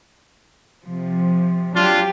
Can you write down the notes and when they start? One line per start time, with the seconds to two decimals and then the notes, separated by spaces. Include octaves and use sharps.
0.85 C3 F3
1.76 F#3 D4 F4 G4